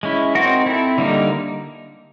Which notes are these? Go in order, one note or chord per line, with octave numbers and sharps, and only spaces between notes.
G#3 C#4 E4
C4 D#4 F#4 A#4
C4 E4 A4
D3 G3 A#3 D#4